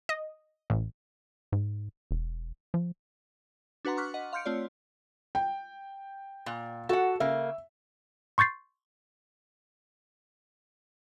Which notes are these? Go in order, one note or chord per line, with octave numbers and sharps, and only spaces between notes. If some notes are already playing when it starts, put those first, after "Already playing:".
D#5
A1
G#2
E1
F3
D4 F#4 B4 F#5 A#5 C6
C#6 D6 F6 F#6 B6
D#5 F#5
F5 C6 F6 G6 C#7 D7
A3 C4 F4 C#5 D5
G5
A#2
F#4 A4 F#5
C#3 A#3 E5
C6 C#6 G6 A6 C7